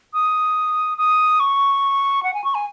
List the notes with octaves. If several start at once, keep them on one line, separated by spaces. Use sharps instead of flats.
D#6
D#6
C#6
F#5
G#5
C#6
G#5